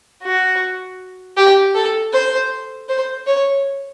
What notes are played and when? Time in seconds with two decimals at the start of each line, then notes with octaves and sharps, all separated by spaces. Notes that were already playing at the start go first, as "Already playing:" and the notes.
0.23 F#4
1.37 G4
1.75 A4
2.13 C5
2.89 C5
3.26 C#5